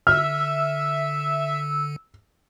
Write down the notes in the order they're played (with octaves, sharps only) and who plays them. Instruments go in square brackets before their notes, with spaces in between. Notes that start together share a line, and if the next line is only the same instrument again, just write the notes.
[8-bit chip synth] D3 [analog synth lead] E5 [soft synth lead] E6 [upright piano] F6